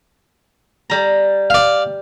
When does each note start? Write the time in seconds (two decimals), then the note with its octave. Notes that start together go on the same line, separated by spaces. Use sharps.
0.90 G3 A#5
1.50 D5 F5